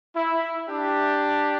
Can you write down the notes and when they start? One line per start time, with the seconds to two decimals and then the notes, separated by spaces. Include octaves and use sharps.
0.16 E4
0.69 D4 G4